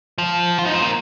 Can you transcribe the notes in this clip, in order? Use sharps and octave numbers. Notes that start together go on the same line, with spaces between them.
F3
F4
D#4
C4
A#3